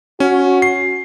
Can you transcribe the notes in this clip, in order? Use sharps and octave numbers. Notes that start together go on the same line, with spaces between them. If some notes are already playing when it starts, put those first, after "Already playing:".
C#4 F#4
C7